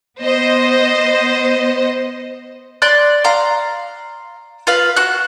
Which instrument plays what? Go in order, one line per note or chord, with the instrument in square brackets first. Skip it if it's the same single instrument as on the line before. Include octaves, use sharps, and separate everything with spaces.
[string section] B3 C5 D#5
[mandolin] D5 C6 F#6
F5 A#5 C6
F4 B4 F5
F#4 F#6